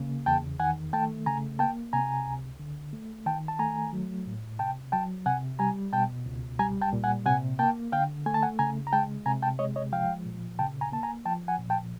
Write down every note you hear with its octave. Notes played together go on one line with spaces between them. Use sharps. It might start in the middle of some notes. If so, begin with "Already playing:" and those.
Already playing: C#3 A#3
E2 G5 A5
D#3 F#5 G#5
A3 G5 A5
C#3 G#5 A#5
A#3 G5 A5
C3 G#5 A#5
C#2
D3
A3
D#3 G5 A5
A5
A3 G#5 A#5
F#3
A2
C3 G5 A5
F#3 G5 A5
C3 F#5 G#5
G3 G#5 A#5
B2 G5 A5
C#2
G3 G#5 A#5
G5 A5
A#2
F#5 G#5
C3 F#5 G#5
A#3 G5 A5
D3 F5 G5
A3 G#5
A5
F#5 G#5
C#3 G#5 A#5
A#5
G#3 G5 A5
C3 G#5 A#5
G5 A5
G#3 C#5 D#5
C#5 D#5
F3 F5 G5
A#2
C#3 G5 A5
G#5 A#5
A#3 A5
G#5 A#5
F3 G5 A5
F#5 G#5
A#2
G5 A5